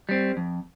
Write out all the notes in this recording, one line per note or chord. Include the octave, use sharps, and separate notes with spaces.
G3 C4
F2